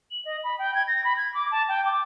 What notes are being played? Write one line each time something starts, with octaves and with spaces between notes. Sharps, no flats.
F#7
D#5
B5
G5
G#6
A#6
B5
G#6
D6
A5
G5
D6